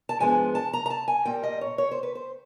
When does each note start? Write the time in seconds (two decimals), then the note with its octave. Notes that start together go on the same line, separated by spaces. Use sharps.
0.09 A5
0.20 G#2 F3 G#3 B3 D4 G#5
0.55 A5
0.73 A#5
0.86 A#5
0.90 A5
1.08 G#5
1.25 A#2 G3 A#3 G5
1.43 D#5
1.61 C#5
1.78 C#5
1.91 C5
2.03 B4
2.15 C5